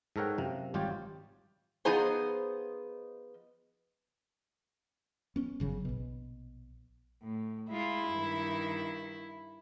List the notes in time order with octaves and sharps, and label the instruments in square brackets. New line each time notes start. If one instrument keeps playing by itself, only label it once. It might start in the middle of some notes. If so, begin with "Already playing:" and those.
[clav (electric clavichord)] G#2 A4 A#4 C#5 F#5 G5
F#2 C3 F3
G#1 G3 F4 G4 C#5 D5
[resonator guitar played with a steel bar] F3 B3 D#4 G#4 C5
[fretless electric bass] B3 C#4
G1 C#3 F#3
A#1 B2
[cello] A2
[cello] G#3 F4 [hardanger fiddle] E4
[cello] G2 D#3